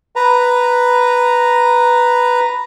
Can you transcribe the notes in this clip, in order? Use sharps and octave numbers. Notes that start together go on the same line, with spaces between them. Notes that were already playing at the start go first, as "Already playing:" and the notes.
B4 A#5